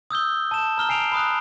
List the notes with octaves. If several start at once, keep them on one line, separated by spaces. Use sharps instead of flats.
D#6 E6 G6 G7
A5 E7
A#5 F6 G7
G#5 C7 D7 F7
B5 D#6 F#6